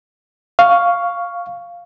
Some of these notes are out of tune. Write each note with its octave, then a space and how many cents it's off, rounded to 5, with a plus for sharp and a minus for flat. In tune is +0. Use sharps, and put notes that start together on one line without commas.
F5 +0 C#6 +10